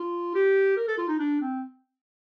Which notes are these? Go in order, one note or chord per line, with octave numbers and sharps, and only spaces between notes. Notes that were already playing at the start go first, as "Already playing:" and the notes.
Already playing: F4
G4
A#4
A4
F4
D#4
D4
C4